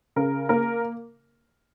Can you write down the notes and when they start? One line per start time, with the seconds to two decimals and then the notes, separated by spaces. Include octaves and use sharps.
0.16 C#3 A#4
0.49 A#3 A#4